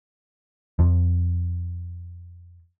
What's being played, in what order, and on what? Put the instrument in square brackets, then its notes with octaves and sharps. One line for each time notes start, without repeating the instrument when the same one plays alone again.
[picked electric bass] F2 F3